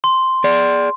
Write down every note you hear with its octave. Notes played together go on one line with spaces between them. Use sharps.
C6
G#4 D5